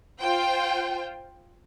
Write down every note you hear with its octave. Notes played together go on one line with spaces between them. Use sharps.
F4 C5 G5